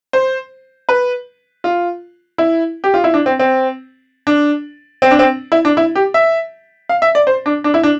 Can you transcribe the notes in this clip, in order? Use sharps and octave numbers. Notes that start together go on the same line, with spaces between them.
C5
B4
F4
E4
G4
F4
E4
D4
C4
C4
D4
C4
D4
C4
E4
D4
E4
G4
E5
F5
E5
D5
C5
D4
D4
E4
D4